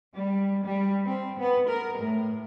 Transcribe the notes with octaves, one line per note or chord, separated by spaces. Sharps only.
G3
G3
C4
B3
A#4
A2